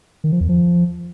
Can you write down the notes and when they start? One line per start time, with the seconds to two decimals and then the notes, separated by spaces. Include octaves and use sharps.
0.24 D#3
0.32 F3
0.41 E2
0.49 F3